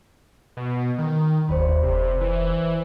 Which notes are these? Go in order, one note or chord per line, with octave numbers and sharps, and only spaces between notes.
B2
D#3
F#1 D#2 C5 D5 B5
F1 C3
E3